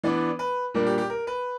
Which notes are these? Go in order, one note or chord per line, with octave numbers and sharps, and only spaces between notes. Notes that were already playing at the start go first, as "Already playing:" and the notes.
E3 B3 D4 D5
B4
A#2 G3 A#3 D4 A#4
G4
G4
A#4
B4